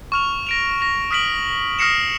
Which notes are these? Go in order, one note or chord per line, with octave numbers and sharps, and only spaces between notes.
C#6 F6 F7
A#6 D7 F7
A#6 F7
D#6 F6 B6 D7 F#7
D#6 F6 A#6 C7 C#7 E7